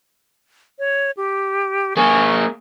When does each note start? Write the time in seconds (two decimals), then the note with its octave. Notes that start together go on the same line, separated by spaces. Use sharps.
0.79 C#5
1.17 G4
1.97 A#3 G#4 C#6